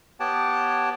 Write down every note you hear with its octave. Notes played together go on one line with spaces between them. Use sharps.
B3 G4 C#5 F#5 G5 A5